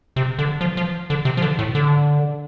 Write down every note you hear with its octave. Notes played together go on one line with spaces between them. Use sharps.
C3
D3
F3
F3
D3
C3
F3
D3
A2
D3